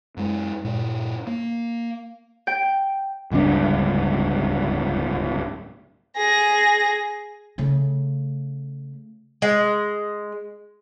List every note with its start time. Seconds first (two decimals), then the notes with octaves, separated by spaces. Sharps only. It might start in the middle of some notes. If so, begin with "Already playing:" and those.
0.17 F#2 G#3
0.64 G2 A#2
1.27 A#3
2.47 G5
3.31 D1 C#2 G2 D4
6.16 G#4 A#6
7.58 C#3 A3
9.42 G#3